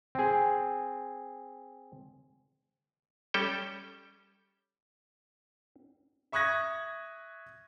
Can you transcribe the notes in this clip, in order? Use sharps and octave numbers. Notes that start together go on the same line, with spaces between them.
C4 G#4
G3 C#4 A4 G5
E5 C#6 D#6 F#6 G#6 A#6